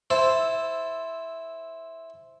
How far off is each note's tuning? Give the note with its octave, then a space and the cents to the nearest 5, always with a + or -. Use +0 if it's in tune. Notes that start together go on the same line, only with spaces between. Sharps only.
E4 -5 A4 +0 C5 +0